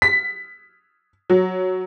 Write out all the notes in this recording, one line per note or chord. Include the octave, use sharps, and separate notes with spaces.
B6
F#3